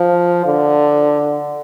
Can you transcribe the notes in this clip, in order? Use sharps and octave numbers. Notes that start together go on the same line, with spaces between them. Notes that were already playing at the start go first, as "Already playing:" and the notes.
Already playing: F3
D3